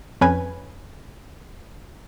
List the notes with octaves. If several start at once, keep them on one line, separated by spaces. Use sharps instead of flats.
F2 C#4 B4 G#5